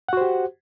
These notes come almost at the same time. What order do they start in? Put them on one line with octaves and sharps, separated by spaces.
F#5 F#4 C5 G4